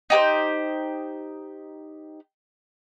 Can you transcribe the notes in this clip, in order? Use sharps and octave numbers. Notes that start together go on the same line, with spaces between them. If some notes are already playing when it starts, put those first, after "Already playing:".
D#4 G4 B4 C5